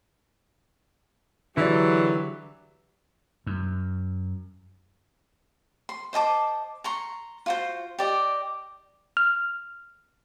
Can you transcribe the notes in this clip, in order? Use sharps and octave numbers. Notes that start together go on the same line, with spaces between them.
D3 E3 F#3 G4 G#4 D5
F#2
C6
C5 D#5 A5 D6
A#5 C6 C#6
F4 F#4 C5
G4 D5 D#5
F6